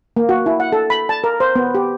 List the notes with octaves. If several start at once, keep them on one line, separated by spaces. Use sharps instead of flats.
A#3
F#4
E4
F#5
A4
B5
A5
A#4
C5
B3
G4